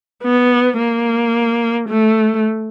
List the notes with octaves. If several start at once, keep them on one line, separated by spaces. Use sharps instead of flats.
B3
A#3
A3